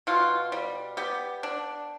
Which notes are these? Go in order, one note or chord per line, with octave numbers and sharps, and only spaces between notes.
B2 F4
G3
B3 G4
D4